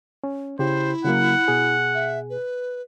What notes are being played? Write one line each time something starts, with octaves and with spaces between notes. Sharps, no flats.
C#4
C#3 E4 G4 C5
C#3 F#3 A#3 F#5
B2 G#4
E5
B4